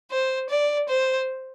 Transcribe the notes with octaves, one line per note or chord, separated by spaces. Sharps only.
C5
D5
C5